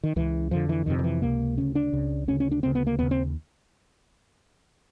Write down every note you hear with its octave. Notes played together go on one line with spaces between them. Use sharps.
D#3
C#2 C#3 E3
F2 D3 F3
E3
F2 C3 D#3
D#3
E3
C#2 C3 A#3
D2 C#3 C#4
D4
C#2 C#3
D2 C#3 C#4
C#4
D4
D2 C#3 C4
B3
A#3
D#2 C#3 B3
C4